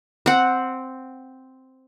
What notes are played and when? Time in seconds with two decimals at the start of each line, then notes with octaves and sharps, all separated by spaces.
0.26 C4 F#5